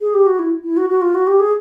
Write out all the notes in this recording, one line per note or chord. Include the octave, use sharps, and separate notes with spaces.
G#4
G4
F#4
E4
E4
F#4
F#4
F4
F#4
G4
G#4